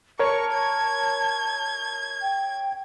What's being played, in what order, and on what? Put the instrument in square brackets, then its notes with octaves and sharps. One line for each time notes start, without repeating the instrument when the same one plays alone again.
[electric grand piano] A#4 C#5 [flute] A5 [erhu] C#6
[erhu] G#6
[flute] G5